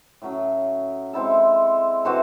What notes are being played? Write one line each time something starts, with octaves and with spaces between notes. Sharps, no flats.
A2 F#3 C#4
G#3 C4 E4 A4
E3 C4 F#4 A4